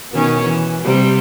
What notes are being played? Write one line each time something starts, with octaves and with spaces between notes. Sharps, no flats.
B2 D#3 C#4
E3
C3 G3